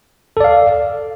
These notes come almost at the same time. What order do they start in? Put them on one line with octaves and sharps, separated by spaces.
A4 D5 F5